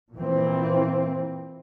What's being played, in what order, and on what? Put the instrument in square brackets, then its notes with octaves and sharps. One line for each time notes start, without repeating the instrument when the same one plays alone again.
[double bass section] A#2 E3 C4